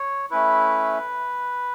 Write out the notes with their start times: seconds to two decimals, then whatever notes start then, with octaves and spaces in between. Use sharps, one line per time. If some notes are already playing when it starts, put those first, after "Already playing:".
Already playing: C#5
0.30 A3 C#4 E4 B4